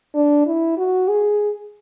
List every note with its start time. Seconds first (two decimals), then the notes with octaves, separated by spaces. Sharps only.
0.14 D4
0.46 E4
0.78 F#4
1.09 G#4